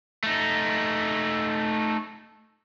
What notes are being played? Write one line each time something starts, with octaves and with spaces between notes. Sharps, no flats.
A3 D#4